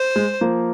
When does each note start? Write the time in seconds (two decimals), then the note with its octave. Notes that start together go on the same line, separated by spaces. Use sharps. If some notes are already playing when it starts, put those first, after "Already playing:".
Already playing: C5
0.16 G#3
0.41 F3 A#3